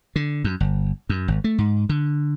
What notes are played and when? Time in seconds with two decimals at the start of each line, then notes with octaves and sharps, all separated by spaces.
0.16 D3
0.44 F#2
0.60 G1
1.09 F#2
1.28 G#1
1.44 A3
1.58 G#2
1.89 D3